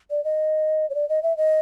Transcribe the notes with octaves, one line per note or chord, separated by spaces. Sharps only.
D5
D#5
C#5
D5
D#5
E5
D#5